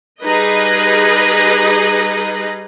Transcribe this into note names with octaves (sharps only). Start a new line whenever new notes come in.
G3 D#4 G#4 B4 D#5